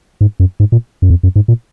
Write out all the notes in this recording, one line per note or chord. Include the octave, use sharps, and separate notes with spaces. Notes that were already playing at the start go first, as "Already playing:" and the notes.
G#2
F#2
G#2
A#2
F#2
F2
F#2
G#2
A#2